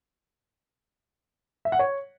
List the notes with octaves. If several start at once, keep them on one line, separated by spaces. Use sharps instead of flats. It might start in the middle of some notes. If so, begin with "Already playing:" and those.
E5
F#5
C#5